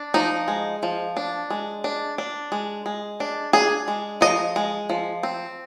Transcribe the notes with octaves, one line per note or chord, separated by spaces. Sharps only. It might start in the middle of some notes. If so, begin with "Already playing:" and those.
Already playing: D4
F3 D#4
G#3
F3
D4
G#3
D4
D4
G#3
G#3
D4
D4 G#4
G#3
F3 D#5
G#3
F3
C4